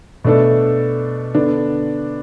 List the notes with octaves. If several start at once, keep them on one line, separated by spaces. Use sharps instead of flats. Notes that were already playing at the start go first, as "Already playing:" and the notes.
B2 A3 D4 A4
D3 B3 D4